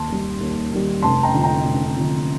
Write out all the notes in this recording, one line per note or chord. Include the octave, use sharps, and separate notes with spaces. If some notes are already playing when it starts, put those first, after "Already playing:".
Already playing: D#2 A5 C6
D#3 G3
D#2
D#3 G3
F1 A5 C6
G5 A#5
F2 D3
G5 A#5
F1
F2 D3